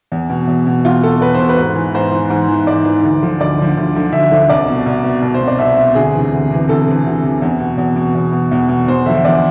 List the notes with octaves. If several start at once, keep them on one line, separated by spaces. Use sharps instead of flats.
E2
B2
E2
B2
E2 F4
B2 A4
E2 B4
B2 C5
B4
G#2
E3
G#2 C5
E3
G#2
E3
G#2 D5
E3
D2
D3 F3
D2 D5
D3 F3
D2
D3 F3
D2 E5
D3 F3
C2 D5
B2
C2
B2
C2
C5
B2
D5
C2 E5
B2
D2 G#4
C3 E3
D2
C3 E3
D2 A4
C3 E3
D2
C3 E3
E2
B2
E2
B2
E2
B2
E2
B2
E2 C5
D3 F3 E5
E2 D5